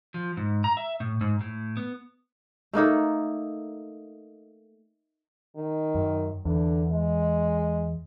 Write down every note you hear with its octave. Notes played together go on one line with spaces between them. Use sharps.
F3
G#2
A#5
E5
A2
G#2
A2
B3
A3 A#3 D#4 A4
D#3
F#2
E2 D3
G#3